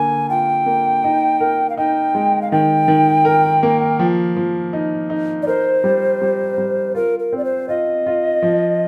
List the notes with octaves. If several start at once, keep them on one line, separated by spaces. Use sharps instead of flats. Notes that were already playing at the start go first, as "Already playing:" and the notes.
Already playing: D3 A#3 G#5
F4 G5
A#3
D#4
A#4
F5
D#4 G5
G#3
F5
D#3 G5
D#3
A#4
A#3
F3
F3
D#4
D#4
D5
A#4 C5
G3
G3
G3
F4 A#4
A#4
C4 D5
C5
F4 D#5
F4
F3